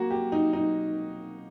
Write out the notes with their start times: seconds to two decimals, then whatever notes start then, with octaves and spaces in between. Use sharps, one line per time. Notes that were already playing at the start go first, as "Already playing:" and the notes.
Already playing: A#3 F#4
0.11 G4
0.32 D#4
0.53 D#4